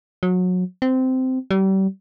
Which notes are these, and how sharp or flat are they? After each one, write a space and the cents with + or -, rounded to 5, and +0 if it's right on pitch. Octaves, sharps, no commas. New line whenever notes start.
F#3 -25
C4 -15
G3 -35